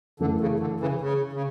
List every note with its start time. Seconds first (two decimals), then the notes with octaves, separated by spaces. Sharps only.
0.19 F#2 D3 E3 A3
0.41 C#3
0.60 D3
0.80 C#3 E3
1.01 C#3
1.33 C#3